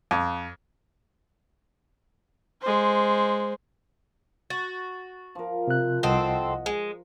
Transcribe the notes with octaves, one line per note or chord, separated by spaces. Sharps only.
F2
G#3 C5
F#4 A6
F3 A#4
C3 F#6
C2 C4 A4 D#5 F#5
G#3